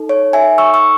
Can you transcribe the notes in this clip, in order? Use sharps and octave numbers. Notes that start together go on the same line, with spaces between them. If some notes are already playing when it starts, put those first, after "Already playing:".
Already playing: D#4 A4
C#5
E5 G#5
C#6 E6
C#6 E6